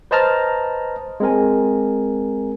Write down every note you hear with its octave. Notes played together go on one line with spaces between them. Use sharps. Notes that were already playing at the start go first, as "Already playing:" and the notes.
B4 C5 D#5 A5 A#5 F6
G#3 C4 A#4 G#5